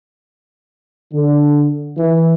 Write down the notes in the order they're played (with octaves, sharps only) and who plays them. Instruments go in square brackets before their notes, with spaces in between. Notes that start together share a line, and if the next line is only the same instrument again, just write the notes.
[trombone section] D3
E3